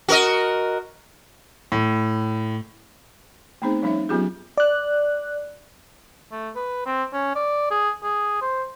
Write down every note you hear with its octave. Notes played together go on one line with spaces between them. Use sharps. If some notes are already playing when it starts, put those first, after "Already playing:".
F#4 A#4 D#5
A2
A3 B3 C4 D#4 G#4 C5
F3 G3 C#4 D#4 C#5 E5
F#3 B3 C#4 F4 G4 G#4
D5 F#6
A3
B4
C4
C#4
D5
G#4
G#4
C5